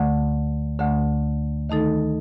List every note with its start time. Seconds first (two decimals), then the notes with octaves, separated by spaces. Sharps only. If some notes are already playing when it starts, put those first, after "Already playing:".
Already playing: D2 D3 A3
0.79 D2 D3 A3
1.69 D#3 A3 D#4 A4